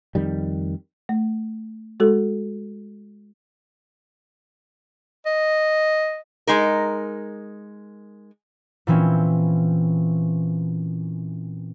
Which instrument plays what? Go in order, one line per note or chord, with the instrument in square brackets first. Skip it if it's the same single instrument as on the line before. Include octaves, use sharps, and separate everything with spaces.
[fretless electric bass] F2 D#3 G3
[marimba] A3
G#3 F#4 A4
[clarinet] D#5
[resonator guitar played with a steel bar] G#3 D#4 A#4
[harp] A#2 E3 C4 C#4